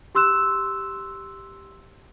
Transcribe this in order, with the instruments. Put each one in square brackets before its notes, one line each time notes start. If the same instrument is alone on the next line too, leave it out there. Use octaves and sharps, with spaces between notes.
[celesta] G4 C6 E6 F#6 E7